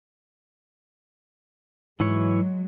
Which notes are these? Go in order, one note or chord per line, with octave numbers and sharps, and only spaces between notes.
G#2 E3 F#3 G#3 E4 C#5